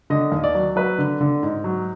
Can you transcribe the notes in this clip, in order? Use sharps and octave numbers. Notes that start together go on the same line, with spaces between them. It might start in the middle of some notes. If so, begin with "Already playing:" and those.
D3 D#5
D#2
D5
F#3
F#3 B4
D3
D3
G#2
F#3